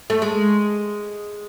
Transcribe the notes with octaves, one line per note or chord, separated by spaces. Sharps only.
A3
G#3